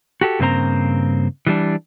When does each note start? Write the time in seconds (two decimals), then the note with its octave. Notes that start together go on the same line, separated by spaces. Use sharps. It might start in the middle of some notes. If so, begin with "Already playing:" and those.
0.21 F#4 G4 A4
0.39 G2 C#3 A#3 C4 C5 A#5
1.46 E3 G3 D4